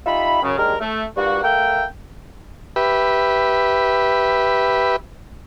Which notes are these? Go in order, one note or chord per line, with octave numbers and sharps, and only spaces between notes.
D#4 F4 G4 E5 B5
F#2 C#3
D#2 G#3 D4 G4 A#4
A3
G2 G3 A#3 F4 F#4
A3 A#4 E5 F5 G5
G4 B4 E5